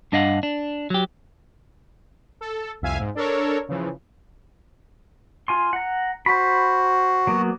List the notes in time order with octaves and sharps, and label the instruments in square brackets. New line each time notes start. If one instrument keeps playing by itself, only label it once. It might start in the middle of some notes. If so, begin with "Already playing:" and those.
[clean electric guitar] G2 D4 D#5 F5 F#5
D4
F#3 G4
[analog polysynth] A4
C2 F2 E5 F5 G#5
G#2
D4 A4 A#4 C#5
C#3 E3 F3
[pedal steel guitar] F4 G#5 C6
F#5 A#5
[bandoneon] F#4 [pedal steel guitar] C5 B5
[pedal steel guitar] F#3 A#3 B3